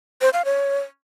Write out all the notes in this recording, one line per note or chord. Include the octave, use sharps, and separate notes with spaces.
C5
F5
C#5